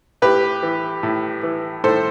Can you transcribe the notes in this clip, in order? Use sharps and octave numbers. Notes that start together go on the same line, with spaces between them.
A2 G4 B4
E3
A2
E3
A2 A4 C5